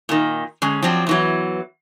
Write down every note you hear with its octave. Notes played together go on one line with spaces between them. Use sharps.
A#2 D#3
D3 G#3 C#4
F3 F#3 C4 D4
E2 E3 F#3